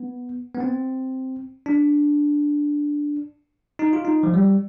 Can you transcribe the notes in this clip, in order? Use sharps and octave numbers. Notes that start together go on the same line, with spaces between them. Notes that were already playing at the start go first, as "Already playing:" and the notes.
Already playing: B3
B3
C4
D4
D#4
F4
D#4
F3
G3